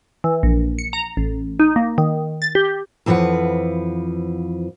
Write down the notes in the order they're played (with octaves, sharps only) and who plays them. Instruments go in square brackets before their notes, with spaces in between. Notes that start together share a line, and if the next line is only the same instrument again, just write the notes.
[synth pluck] E3
A#1
C#7
A#5
A1
D#4
A#3
D#3
A6
G4
[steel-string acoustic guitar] F2 E3 F3 B4 F#5